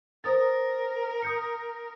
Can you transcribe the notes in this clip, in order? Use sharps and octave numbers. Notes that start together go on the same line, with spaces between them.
A#4 C5 D#6 A6
D#6 G6 C#7